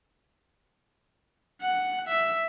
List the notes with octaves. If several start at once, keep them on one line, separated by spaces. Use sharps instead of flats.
F#5
E5